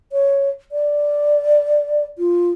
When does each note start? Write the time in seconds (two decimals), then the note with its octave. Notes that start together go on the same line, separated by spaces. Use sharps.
0.12 C#5
0.72 D5
2.18 F4